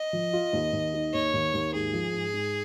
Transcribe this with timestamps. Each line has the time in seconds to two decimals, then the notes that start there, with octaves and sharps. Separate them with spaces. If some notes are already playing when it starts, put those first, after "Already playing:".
Already playing: D#5
0.13 F3
0.33 F4
0.53 D#2
0.73 D#2
0.94 D#3
1.13 D#2 C#5
1.34 D#2
1.54 D#2
1.74 G#2 G#4
1.93 F3
2.14 G#2
2.33 G#2